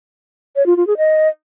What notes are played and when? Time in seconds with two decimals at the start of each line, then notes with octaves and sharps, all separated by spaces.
0.56 C#5
0.66 F4
0.77 F4
0.87 G#4
0.97 D#5